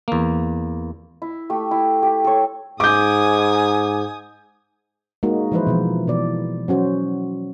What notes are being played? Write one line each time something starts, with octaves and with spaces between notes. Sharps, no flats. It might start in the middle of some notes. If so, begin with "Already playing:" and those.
E2 A#3
E4
A3 G4
E4
G4
A4 C#5
G#2 G#5 D6 D#6 G6
G#3 A#3 D#4 F#4
E3 F3 G#3 E4 B4 C5
B2 E3 F3
B2 E3 D5
F#3 C#4 F#4 C5